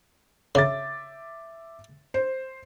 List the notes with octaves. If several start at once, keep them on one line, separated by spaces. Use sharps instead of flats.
C#3 E5 D6 A6
C5